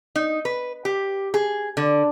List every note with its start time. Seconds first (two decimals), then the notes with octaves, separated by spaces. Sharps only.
0.16 D#4
0.45 B4
0.85 G4
1.34 G#4
1.77 D3